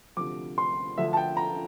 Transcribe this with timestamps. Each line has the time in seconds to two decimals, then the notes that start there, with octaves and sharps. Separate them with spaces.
0.17 D2 C3 F3 D6
0.58 C6
0.98 D2 D3 F3 E5
1.13 A5
1.17 G5
1.37 A#5